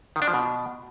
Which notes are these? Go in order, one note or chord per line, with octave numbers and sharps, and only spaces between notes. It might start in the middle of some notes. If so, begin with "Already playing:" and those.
D#3
D4
F3
B2